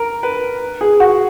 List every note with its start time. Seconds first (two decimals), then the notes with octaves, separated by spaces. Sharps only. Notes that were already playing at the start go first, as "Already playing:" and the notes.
Already playing: A#4
0.23 B4
0.81 G#4
1.00 F#4